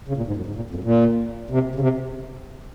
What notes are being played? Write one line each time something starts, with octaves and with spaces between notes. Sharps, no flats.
C#3
A#2
G#2
F#2
G#2
A#2
F2
F#2
A#2
C3
C#3
C3